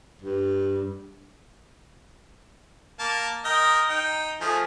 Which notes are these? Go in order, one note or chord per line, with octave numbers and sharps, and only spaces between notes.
G2
A#3 A5
A#4 D#5 G5
D#4 G5
F3 A3 G#4